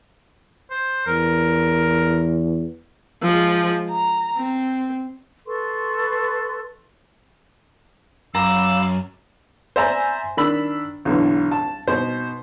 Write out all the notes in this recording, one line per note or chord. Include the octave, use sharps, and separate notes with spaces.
C5
E2 A#4
F3 G#3
A#5
C4
A4 B4 C6 C#6
F#2 F5 A#5 B5 D6 E6
C5 D5 E5 G#5 A#5 B5
D#3 D4 B5 E6
B1 D3 E3
A5
B2 D#4 C5